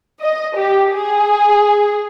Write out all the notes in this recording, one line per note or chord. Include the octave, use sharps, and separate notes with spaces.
D#5
G4
G#4